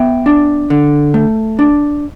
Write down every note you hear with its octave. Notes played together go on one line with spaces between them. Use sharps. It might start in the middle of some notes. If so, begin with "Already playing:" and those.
Already playing: B3 E5 G5
D4
D3
A3
D4